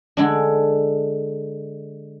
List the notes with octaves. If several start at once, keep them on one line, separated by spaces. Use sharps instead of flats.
D3 G#3 D4